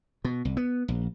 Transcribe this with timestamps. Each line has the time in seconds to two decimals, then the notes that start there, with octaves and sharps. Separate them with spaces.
0.24 B2
0.45 C2
0.57 B3
0.88 A#1